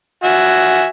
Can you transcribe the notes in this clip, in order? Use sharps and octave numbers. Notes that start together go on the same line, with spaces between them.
F#4 E5 G#5